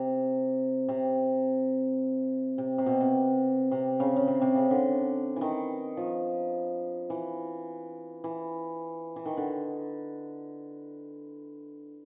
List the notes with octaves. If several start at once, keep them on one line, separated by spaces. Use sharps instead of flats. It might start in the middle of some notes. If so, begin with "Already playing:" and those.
Already playing: C3
C3
C3
C3
B2
C3
C3
C#3
C#3
C3
C3
C#3
D3
D#3 E3
F3
E3
E3
E3
D#3
D3